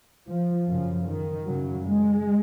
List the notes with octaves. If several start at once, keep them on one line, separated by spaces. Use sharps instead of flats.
F3
F#2 C#3 F3
D#3
F#2 C#3 F#3
G#3